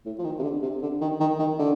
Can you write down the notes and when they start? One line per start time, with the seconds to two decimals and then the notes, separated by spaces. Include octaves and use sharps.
0.06 A2
0.19 F3
0.24 D#3
0.39 C3
0.43 D3
0.62 C3
0.82 D3
1.01 D#3
1.20 D#3
1.39 D#3
1.59 D3